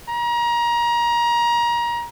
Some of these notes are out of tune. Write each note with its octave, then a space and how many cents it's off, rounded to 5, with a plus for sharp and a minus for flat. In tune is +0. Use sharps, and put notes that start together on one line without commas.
A#5 +25